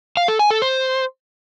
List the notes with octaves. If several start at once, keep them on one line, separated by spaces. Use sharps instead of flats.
F5
A4
G#5
A4
C5